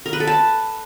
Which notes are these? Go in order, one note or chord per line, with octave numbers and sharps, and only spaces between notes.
A#4
B4
A4
A5